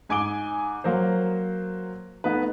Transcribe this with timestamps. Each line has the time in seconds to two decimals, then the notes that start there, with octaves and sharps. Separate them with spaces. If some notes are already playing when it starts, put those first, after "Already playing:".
0.09 G#2 G#5 D6 D7 G7
0.84 F#3 A#3 C5
2.24 A3 B3 D#4 B4